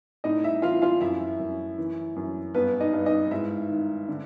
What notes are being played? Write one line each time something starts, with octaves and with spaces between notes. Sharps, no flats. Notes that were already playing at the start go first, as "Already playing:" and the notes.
A2 D#4 D#5
E4 E5
E3 F4 F5
F4 F5
F#2 E4 E5
F#2
E3
F#2
G2 B3 B4
D#4 D#5
G2
D#4 D#5
G#2 E4 E5
D#3
D3